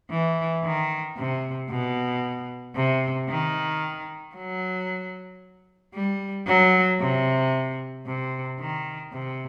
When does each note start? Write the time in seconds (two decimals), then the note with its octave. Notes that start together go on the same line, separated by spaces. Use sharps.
0.11 E3
0.64 D#3
1.17 C3
1.70 B2
2.75 C3
3.29 D#3
4.35 F#3
5.94 G3
6.47 F#3
7.00 C3
8.06 C3
8.59 D#3
9.13 C3